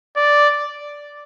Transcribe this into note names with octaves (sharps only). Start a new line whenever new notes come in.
D5